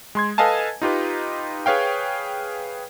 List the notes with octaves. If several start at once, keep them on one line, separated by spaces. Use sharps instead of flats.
G#3 C6 G#6
A4 B4 D#5 F5 G#5 A5
D#4 F4 G4 B4
G#4 B4 C#5 F5 G5